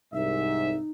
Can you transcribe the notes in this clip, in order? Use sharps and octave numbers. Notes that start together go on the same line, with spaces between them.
C2 G#2 D#4 E5